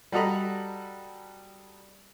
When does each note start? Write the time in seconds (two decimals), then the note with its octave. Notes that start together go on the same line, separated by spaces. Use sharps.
0.12 G3 F#4 A4 D#5 A#5 B5